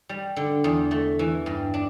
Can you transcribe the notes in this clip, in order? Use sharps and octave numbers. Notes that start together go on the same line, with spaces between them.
G3
D3
E2
A3
E3
G2
D4